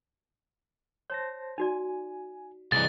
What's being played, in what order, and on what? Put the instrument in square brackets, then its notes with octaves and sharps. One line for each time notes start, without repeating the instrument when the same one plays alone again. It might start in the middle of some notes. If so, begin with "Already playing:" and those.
[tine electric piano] C5 A5 A#6 [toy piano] C#5
[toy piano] D#4 F#4 D5 [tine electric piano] G#5
[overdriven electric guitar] C2 E3 [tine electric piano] G#4 D5 D#5 [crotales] A6